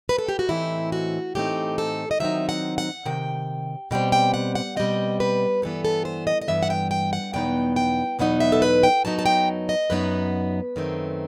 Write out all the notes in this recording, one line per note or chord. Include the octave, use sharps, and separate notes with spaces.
B4
A4
G4
F#4
A2 E3 A3 C4 D#4 E4
F#4
A2 E3 A3 C4 D#4 G4
A4
D#5
C3 D#3 F#3 C4 D#4 E5
F#5
F#5
C3 D#3 G5
B2 G3 C4 G5
G5
F#5
F#5
B2 G3 C4 D#5
B4
G2 E3 B3 A4
A4
C5
D#5
D#5
G2 E3 B3 E5
F#5
G5
G5
F#5
E2 B2 F#3 B3 D#4 G5
G5
E2 B2 F#3 B3 D#4 F#5
E5
A4
B4
G5
F#2 F#3 B3 D#4 A5
A5
G5
D#5
F#2 F#3 B3 D#4 B4
F#2 D#3 A3 C4